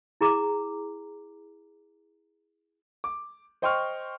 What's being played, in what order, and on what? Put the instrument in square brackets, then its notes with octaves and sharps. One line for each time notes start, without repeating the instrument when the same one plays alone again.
[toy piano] E4 G#4 A#5 D6
[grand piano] D6
C5 D#5 G5 C6 C#6 F6